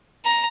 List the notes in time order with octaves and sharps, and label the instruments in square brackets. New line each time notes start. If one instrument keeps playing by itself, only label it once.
[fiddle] A#5